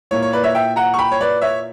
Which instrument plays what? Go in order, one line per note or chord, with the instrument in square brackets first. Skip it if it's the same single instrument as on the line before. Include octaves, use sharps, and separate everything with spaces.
[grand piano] A#2 A#3 E4 C#5
C#5
B4 D5
C#5 E5
E5 G5
F#5 A#5
C#6
G5 B5
C#5
B4 D5
C#5 E5